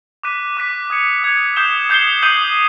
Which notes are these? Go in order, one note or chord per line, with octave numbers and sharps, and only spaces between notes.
D6 F#6 B6 D#7
D6 F#6 B6 D#7
D#6 G#6 C#7 F7
D#6 G#6 C#7 F7
D#6 G6 C7 E7 G7
D#6 G6 C7 E7 G7
D#6 G6 C7 D#7 F#7